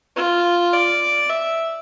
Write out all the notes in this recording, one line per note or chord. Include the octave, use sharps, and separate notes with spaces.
F4
D5
E5